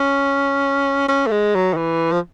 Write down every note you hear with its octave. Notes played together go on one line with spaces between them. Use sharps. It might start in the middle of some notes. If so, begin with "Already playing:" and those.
Already playing: C#4
C#4
A3
G#3
F#3
D#3
E3
F3